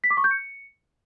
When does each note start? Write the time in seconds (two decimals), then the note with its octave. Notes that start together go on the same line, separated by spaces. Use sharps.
0.04 B6
0.10 D6
0.17 C#6
0.24 G6
0.31 C#7